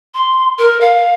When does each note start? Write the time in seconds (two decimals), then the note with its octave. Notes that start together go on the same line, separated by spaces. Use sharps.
0.14 C6
0.58 A#4
0.80 F5